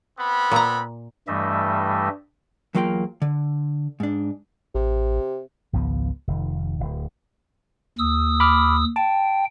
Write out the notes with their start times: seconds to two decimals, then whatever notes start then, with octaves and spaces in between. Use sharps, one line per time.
0.19 B3 C4 B5
0.52 A#2 A#5
1.27 G2 E3 G3 A3 D#5 E5
2.75 E2 F#3 A#3 F4 F#5 G5
3.22 D3
4.00 G#2 D4
4.75 A1 C3
5.73 G#1 C#2 F3 B3
6.27 F1 D#3
6.80 D1
7.98 D#2 D#6 E6
8.40 B5 D6 F6
8.96 G5 A5